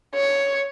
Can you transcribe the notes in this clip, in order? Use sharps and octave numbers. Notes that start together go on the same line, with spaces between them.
C#5